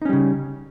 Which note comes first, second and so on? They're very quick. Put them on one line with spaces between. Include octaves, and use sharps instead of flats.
D#4 C#4 G3 C#3